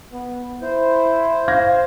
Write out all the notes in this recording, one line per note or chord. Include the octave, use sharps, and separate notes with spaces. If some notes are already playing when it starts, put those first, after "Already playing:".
B3
E4 C5
F5 G#6 A#6